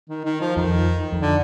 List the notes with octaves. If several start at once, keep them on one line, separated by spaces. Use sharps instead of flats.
D#3
D#3
F3
F2 D#3
F2
D3